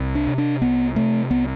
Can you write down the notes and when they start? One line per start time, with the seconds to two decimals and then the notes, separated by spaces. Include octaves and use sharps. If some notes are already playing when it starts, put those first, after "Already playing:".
Already playing: C2
0.15 D4
0.27 C3
0.38 D4
0.62 C2 B3
0.96 C3 A3
1.30 C2 B3